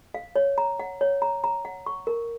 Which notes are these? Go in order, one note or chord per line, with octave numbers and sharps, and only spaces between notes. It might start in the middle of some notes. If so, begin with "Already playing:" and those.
F5
C#5
A#5
F#5
C#5
A#5
A#5
F#5
C#6
A#4